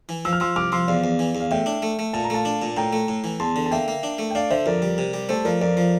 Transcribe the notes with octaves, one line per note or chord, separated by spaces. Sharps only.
E3
F3 E6
F6
F3 C6 E6
C2 D6 F6
F3 C6 E6
E2 D5 F5
E2
E3
E2
F5
A2 E5 G5
D4
A3
A3
A#2 A5
A#5
A3 F5 A5
D4
A#2
A2 G5 A#5
A3
A2
E3
E2 A5 C6
D3
A5
A#3 E5 G5
A#3
D4
A3
G5
D4 D5 F5
D3 C5 E5
F2 A#4 D5
G3
C3
G3
A3 A4 C5
F3 A#4 D5
F2 A#4 D5
F3